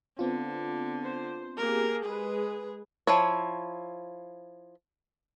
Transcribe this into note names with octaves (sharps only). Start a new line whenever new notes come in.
D3 B3 C4 F4
C5
A#3 G4 G#4 A#4
G#3 G#4 B4
F3 E4 C#5